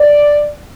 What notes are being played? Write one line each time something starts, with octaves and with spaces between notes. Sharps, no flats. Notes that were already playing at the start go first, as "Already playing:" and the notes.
Already playing: D5